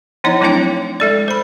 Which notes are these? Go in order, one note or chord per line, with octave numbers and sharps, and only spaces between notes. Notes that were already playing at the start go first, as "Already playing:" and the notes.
F3 B3 D#4 E4 C#5 D#5
F#3 A3 C4 D4 E4 G5
G#3 A4 D5
C5 B5